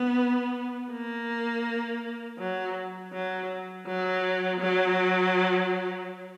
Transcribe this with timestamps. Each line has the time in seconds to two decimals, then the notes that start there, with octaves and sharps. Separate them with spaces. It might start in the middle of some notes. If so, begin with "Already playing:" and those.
Already playing: B3
0.91 A#3
2.39 F#3
3.13 F#3
3.86 F#3
4.60 F#3